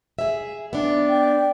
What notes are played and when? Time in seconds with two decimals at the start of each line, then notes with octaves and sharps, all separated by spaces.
0.19 G#4 E5
0.73 B3 D4 D5
1.09 G5